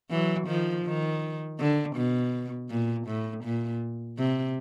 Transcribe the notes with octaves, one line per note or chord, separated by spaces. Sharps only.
E3 F#3
D#3 F3
D#3
D3
B2
A#2
A2
A#2
C3